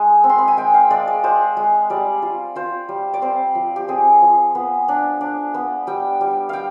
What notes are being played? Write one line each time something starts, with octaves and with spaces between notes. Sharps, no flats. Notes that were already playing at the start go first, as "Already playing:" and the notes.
Already playing: G#3 D#4
C4
C6
B5
G#5
G#3 G5
F5
G#3 D5
D5
G#3 C5
G#3
G3 D5
F4
F4 C5
G3
D5
C4 C5
F3
G4
C4 G#4
F3
B3
D4
D4
B3
G3 G5
G3
G3 F5 G5